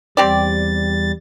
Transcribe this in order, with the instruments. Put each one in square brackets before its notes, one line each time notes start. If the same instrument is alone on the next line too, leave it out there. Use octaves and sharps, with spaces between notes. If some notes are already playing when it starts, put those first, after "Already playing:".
[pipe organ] E2 G3 A6 [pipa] C4 G4 D5